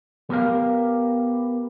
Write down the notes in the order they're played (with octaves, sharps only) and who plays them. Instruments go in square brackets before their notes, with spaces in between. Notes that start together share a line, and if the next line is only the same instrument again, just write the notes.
[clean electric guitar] B3 G4 A#4 F5